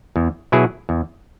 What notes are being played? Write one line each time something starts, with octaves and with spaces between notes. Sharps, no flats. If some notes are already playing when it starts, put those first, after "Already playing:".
E2
B2 F#3 E4 G#4
E2